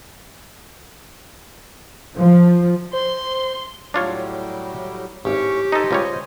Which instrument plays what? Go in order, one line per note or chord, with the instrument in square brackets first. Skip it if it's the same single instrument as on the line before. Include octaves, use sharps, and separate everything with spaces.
[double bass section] F3
[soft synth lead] C5 [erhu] C6
[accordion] A2 F#3 G3 [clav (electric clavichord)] D4 F4 C#5
[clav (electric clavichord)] G#1 [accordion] A2 C#4 C#6 [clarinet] G4
[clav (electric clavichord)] D#4 A4 [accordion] C5 D#5 G#5
[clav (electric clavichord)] C#2 G3 C#5